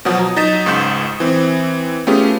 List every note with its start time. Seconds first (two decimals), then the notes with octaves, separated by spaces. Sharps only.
0.05 B2 F3 F#3 F#5 D#6
0.19 A#5
0.36 F#3 D#4 D#5 A6 B6 E7
0.66 C#2 G#2 C#6 D#6 G6 E7
1.20 E3 C4
2.07 A3 B3 C#4 F4 G4 G#4